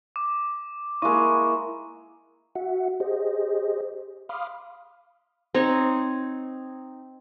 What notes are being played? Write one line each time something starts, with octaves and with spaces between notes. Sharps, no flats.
D6
G#3 A#3 E4 C#6
F#4 E5 F#5
G4 G#4 C5 D#5
F5 B5 C6 D6 D#6 F6
C4 D#4 C#5